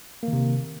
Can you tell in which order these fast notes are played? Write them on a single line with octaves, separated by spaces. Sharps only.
A#3 D#3 C3